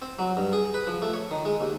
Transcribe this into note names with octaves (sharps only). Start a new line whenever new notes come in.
C4
F#3
G2
G#4
B4
F3
A3
C#5
D#3
G#3
D#2